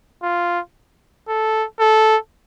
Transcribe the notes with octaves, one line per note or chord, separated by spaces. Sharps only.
F4
A4
A4